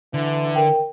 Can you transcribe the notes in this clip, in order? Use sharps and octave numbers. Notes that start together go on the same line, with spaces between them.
D3 E3
A#4 G5